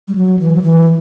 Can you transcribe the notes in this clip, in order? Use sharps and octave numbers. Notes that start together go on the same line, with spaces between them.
G3
F#3
E3
F#3
E3